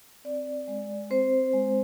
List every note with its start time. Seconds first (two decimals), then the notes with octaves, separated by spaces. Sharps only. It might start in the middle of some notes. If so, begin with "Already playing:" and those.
0.24 C4 D5
0.68 G#3
1.10 C4 C5
1.53 G#3